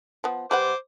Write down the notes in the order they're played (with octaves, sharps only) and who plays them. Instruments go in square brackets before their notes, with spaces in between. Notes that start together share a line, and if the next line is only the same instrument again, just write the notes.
[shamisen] F3 B3
[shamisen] G3 B4 F#5 [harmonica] C5 D6